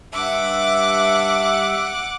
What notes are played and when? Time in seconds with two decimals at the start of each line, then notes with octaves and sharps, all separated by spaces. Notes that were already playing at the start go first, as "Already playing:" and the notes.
0.13 G2 E5 F#5 D6